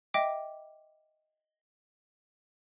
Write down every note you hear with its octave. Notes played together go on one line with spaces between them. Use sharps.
D#5 E5 G5 D6